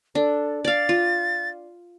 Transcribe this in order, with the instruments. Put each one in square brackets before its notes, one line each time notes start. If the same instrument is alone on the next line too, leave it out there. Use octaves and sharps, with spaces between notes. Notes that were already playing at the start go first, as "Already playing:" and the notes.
[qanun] D4 [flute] A4
[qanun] D5 F5 [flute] A6
[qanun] F4